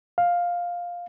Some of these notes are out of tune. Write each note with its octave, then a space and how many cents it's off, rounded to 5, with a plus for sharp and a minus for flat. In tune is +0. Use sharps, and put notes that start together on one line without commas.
F5 +5